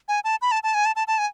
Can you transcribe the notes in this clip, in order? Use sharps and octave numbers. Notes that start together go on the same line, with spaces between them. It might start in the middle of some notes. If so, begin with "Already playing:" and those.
G#5
A5
B5
A5
A5
G#5
A5
A5
A5
G#5